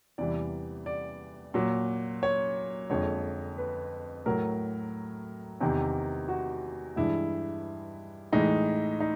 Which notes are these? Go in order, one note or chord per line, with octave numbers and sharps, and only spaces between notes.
E2 C3 E3 G3 D5
D5
A#2 F#3
C#5
F2 D3 F3 G#3 C#5
B4
A2 F#3 A#4
E2 C3 D#3
F#4
G2 E3 G#3 E4
A2 E3 G#3 D#4
D#4